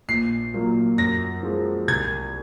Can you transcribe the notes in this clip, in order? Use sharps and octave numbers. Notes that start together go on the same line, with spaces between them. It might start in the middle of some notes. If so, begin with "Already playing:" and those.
A#1 C7
A#2 F#3 A#3
F#2 A#6
F3 G#3
C2 G#6